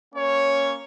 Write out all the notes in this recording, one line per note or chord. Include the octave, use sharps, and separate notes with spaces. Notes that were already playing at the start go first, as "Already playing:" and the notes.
A#3 C#4 C#5